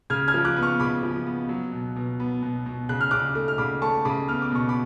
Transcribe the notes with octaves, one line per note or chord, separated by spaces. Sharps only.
C#3 F6 G#6
F6 G#6
F3
D6 F#6
B3
C#6 F6
C#3 B5 D6
F3
B3
F#3
B2
B2
B3
B2
B2
C#3 F#6
F6
C#3 D6 F#6
A3
F6
C#3 B5 D6
A3 A5 C#6
C#3 B5 D6
B3 F6
D6
B2 C#6
B5 D6